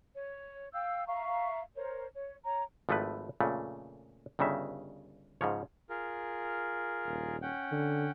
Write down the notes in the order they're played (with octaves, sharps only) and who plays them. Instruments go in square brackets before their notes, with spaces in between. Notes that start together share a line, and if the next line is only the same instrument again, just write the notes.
[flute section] C#5
F5 G5 E6 G6
E5 F5 A#5 C#6
A#4 C5 C#5
C#5
C#5 A#5
[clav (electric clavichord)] G#1 F3 A3 E4 B4
F2 A#2 C#3 A3
G1 G2 C#3 D#4 E5
G#2 C#3 F3 C#5
[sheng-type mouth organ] F4 G#4 A#4
[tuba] D#1
[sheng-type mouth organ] C#4 F#5 G5
[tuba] D3